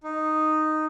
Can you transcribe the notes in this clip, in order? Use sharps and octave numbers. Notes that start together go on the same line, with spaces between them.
D#4